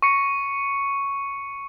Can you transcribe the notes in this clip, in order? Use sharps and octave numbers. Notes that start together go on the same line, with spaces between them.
C#6 C#7